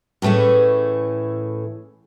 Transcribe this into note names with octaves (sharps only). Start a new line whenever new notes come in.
A2 E3 A3 C#4 G#4